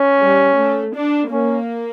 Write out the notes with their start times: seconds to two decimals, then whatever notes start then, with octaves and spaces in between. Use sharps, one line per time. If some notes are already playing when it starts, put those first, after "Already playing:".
Already playing: C#4
0.21 G3
0.58 A3
0.95 D4
1.31 A#3 C#4